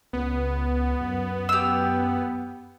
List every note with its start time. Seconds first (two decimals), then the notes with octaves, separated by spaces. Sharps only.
0.13 C#2 B3
1.01 F#2
1.49 G4 E6